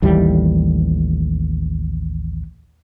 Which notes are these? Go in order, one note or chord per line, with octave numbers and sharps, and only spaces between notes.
A1 D#2 E3 G3